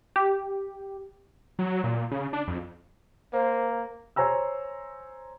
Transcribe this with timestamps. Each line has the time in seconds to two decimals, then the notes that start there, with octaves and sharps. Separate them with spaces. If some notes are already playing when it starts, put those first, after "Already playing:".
0.16 G4
1.59 F#3
1.84 A#2
2.11 C#3
2.33 D4
2.48 F2
3.33 A#3 C5
4.16 C5 C#5 G#5 A#5 E6